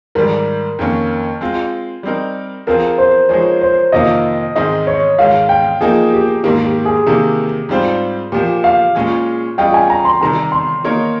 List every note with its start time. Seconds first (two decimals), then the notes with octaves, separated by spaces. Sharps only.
0.15 G#2 D#3 G3 A#4
0.79 F2 D#3 A#3 C#4
1.41 G#3 C4 F4
2.03 G3 C4 D#4 A#4
2.67 F3 C4 F4 G#4 A#4
2.98 C5
3.29 F3 G#3 D#4 G#4 C#5
3.61 C5
3.92 F2 C3 D#3 A#3 F4 D#5
4.56 G#2 D#3 G#3 C4 D#4 D#5
4.87 C#5
5.19 G#2 D#3 G#3 F5
5.49 G5
5.81 F3 A#3 D#4 G#4
6.13 G4
6.43 G#2 D#3 A#3 G4
6.64 G4
6.85 G#4
7.06 C3 D#3 A#3 G4
7.69 G#2 G3 C4 F4 C5
8.32 A#2 F3 A#3 G4
8.64 F5
8.95 A#2 G#3 C#4 F4 G#4
9.58 G3 C#4 F4 G#4 D#5 G5
9.74 G#5
9.90 A#5
10.05 C6
10.21 C3 D#3 G3 A#5
10.52 C6
10.84 D#3 A#3 D#4 A#4 C#5